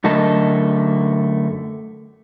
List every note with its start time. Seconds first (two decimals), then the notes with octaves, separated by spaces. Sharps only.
0.04 F#2 D3 A3 A#4 D#5 A5